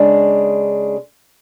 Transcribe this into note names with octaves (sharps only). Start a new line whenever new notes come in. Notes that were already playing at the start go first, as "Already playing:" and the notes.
Already playing: C#3 G#3 D4